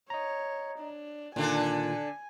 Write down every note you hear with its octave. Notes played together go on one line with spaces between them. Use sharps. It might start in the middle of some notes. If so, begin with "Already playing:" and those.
C#5 D#5 A#5
D4
A#2 D3 D#3 D4 F4 A4 G#5